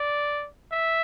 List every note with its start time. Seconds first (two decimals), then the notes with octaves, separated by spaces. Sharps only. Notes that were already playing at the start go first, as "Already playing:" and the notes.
Already playing: D5
0.72 E5